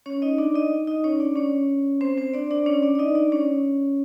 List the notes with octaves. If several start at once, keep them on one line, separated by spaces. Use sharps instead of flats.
C#4 C#5
D#4 D#5
D4 D5
D#4 D#5
D#4 D#5
C#4 C#5
D4 D5
C#4 C#5
C4 C5
C4 C5
D4 D5
D4 D5
C#4 C#5
D4 D5
D5
D#4 D#5
D4 D5
C#4 C#5